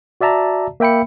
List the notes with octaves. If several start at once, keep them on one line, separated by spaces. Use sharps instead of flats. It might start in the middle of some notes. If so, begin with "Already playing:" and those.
F#4 D5 E5 A5 A#5
A#3 E5 G5 B5 C#7